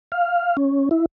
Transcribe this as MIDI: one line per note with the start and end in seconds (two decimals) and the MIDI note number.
0.12 0.57 77
0.57 0.89 61
0.91 1.06 64